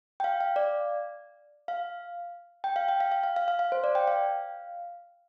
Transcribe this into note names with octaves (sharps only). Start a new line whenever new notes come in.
G5
F5
F5
D5
F5
G5
F5
G5
F5
F5
F5
F5
F5
F5
C5
D5
G5
F5